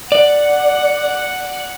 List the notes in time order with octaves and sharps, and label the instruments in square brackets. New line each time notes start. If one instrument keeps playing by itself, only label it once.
[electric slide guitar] D5 [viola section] F#5